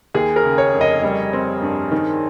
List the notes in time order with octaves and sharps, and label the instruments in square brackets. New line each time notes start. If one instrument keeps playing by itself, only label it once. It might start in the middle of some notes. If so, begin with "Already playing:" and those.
[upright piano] D#2 [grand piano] G#4
[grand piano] A#4
[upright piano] C#3
[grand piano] C#5
[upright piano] F1
[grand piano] D#5
[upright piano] G3 [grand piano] D#5
[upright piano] C4
G2
D#3